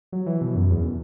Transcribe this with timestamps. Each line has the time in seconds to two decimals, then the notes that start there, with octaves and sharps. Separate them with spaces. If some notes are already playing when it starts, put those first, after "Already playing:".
0.12 F#3
0.26 E3
0.41 B2
0.55 F#2
0.70 E2